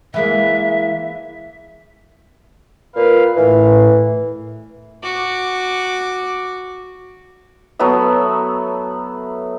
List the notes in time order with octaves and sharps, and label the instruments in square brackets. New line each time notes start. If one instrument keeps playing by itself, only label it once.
[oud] E3 G#3 A#3 [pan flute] E5
[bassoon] A#2 [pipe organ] B4 F5
[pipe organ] A2 [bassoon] E3
[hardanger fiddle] F#4 D6
[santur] F#3 A3 B3 E5